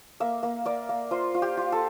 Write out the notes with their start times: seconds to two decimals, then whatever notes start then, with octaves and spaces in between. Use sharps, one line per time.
0.20 A#3 E5
0.43 A#3
0.65 A#3 D5
0.89 A#3
1.11 F4 C5
1.34 F4
1.42 G4
1.57 F4
1.72 A4